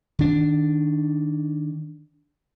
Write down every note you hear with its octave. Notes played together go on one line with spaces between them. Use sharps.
D#3 D4